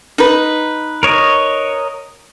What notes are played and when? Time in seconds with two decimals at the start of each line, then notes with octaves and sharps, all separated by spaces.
0.18 D#4 B4
1.03 A#4 C#5 D#5